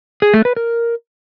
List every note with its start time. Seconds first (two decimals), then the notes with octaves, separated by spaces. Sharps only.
0.22 G#4
0.34 A3
0.45 B4
0.57 A#4